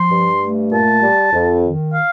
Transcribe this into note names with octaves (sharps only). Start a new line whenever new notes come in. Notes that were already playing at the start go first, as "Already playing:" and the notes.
Already playing: F3 C6
G2
A3
A#2 A5
G3
F2
D#3
F5